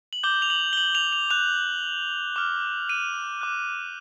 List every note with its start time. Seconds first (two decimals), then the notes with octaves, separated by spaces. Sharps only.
0.13 F#7
0.23 D6 G6 G7
0.42 F7
0.50 F#7
0.73 G7
0.77 F#7
0.95 F7
1.13 F7
1.31 D6 F#6 F7
2.36 D6 F6
2.89 D#7
3.41 D6 F#6